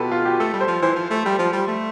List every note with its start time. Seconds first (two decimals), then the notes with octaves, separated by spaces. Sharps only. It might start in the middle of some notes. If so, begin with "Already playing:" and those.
Already playing: B2 F4 G4 A4 B4
0.12 F4
0.25 G4
0.40 A3 A4
0.53 G3
0.61 C5
0.68 F3
0.82 E3 C5
0.96 F3
1.10 A3
1.26 G3
1.39 F3
1.53 G3
1.68 A3